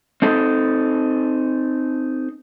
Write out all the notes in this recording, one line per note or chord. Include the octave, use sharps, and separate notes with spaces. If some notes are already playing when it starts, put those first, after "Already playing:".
C4 D#4 A4